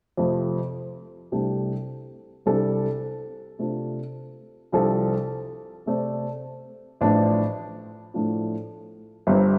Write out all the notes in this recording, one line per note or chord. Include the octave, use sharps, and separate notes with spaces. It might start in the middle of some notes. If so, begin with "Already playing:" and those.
F2 C3 F3 A3
C2 C3 A3 D4 G4
C2 C3 G3 D4 A4
C3 A3 D4 F4
C2 C3 F3 D4 A4
C3 A3 C4 A4 D5
A1 A2 F3 D4
A2 F3 A3 D4 F4
G1 G2 G3 C4